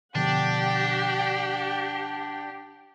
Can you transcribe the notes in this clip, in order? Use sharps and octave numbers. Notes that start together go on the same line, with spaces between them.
B2 D3 F3 D4 G4 F#5 G5